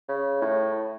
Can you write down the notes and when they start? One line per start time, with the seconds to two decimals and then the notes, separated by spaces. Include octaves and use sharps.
0.08 C#3
0.41 A2